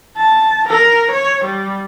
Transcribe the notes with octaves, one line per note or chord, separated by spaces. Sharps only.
A5
A#4
C#5
G3